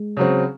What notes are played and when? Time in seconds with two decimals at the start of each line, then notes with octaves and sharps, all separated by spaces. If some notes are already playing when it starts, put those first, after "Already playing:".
Already playing: G#3
0.17 C#3 F#3 C4